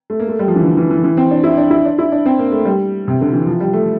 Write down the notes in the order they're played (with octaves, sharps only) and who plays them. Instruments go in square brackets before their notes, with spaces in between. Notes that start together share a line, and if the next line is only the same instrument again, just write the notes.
[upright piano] A3
A#3
A3
G3
F3
E3
D3
E3
E3
E3
C4
D4
E4
D4
E4
D4
E4
D4
C4
A#3
A3
G3
C3
D3
E3
F3
G3
A3